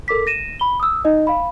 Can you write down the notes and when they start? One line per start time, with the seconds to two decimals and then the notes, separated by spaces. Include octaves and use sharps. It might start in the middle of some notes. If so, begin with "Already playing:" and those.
0.08 A4 A#4 D6 B6
0.27 A#6 D#7 E7
0.60 B5 G7
0.80 D#6 E6
1.05 D#4 D#5
1.27 F5 B5